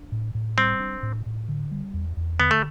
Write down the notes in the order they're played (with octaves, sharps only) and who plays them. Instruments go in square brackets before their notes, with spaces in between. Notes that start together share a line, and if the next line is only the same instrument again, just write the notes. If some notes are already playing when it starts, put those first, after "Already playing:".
Already playing: [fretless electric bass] D4
A2
A2
[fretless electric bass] G3 [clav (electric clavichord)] C4
[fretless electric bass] D4
A2
A2
D3
G3
E2
E2
[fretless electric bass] D3 [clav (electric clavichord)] B3
[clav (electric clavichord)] A3